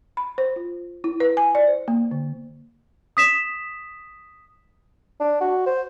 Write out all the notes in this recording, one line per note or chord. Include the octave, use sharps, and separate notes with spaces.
B5
C5
F4
E4
B4
G#5
D5
C5
A#3
D3
D#6 B6 E7
D4
F#4
C5